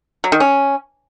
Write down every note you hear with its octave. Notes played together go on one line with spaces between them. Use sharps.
F#3
D#3
C#4